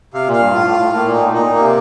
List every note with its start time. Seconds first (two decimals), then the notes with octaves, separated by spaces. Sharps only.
0.14 C3 F5
0.27 A#2
0.33 F5
0.40 G2
0.53 A2 F4
0.67 A2
0.73 F5
0.80 A2
0.93 A2 A#3
1.06 A#2
1.13 D#4
1.19 A2
1.32 A#2 D#4
1.46 A#2
1.52 A#3
1.59 C3